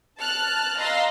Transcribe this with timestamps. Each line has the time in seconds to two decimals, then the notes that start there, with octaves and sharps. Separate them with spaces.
0.19 A5 F6 F#6
0.78 D#5 F5 A#5 C6 E6